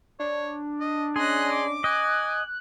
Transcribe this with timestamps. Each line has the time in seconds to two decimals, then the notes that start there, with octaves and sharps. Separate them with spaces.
0.20 D4 C#5
0.80 D#5
1.16 C#4 G#4 D#5 C6 F#6
1.53 D6
1.84 D#5 G#5 F#6